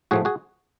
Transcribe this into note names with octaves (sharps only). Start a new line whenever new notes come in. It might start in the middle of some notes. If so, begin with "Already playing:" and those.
A2 F3 A3 F#4 G#4
F#4 G#4